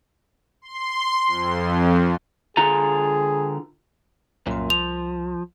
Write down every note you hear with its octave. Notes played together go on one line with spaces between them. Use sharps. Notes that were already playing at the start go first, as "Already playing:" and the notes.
C6
F2
D3 F4 G#4 A#5
C2 F#2 A#2 C6
F3 F7